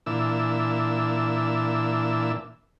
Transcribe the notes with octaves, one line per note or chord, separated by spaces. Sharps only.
A#2 E3 D4 E6